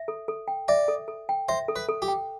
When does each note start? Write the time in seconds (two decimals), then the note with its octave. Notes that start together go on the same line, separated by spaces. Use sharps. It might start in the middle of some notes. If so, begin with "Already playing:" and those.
Already playing: E5
0.08 A4
0.28 A4
0.48 G5
0.68 D5 E5
0.88 A4
1.08 A4
1.29 G5
1.49 C5 E5
1.68 A4
1.76 B4
1.88 A4
2.02 G4
2.08 G5